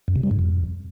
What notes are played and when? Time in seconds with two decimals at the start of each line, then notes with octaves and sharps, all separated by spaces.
0.08 F#2
0.16 C3
0.23 G3
0.31 G#2
0.39 F2